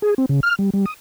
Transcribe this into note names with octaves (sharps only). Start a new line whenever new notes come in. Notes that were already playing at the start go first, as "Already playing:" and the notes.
G#4
C4
C#3
F6
G3
G3
D#6